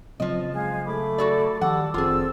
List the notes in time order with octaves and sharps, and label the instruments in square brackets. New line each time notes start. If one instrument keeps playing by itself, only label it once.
[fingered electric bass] C#3 F#3 C4 [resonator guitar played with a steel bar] F3 D#5
[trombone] G#3 [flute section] G#4 F5 F#6
[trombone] A3 [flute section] B5 D6
[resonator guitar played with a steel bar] F#4 A4 D5
[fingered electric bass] D#3 F3 [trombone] G3 [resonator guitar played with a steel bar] F#5 [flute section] A5 D6 E6
[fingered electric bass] F1 D#3 [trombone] C4 [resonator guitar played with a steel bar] F4 G#4 [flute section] A4 E6